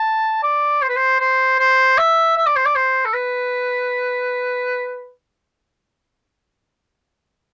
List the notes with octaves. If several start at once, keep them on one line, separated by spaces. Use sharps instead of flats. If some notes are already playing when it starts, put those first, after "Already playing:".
Already playing: A5
D5
C5
B4
C5
C5
C5
E5
E5
D5
C5
D5
C5
A4
B4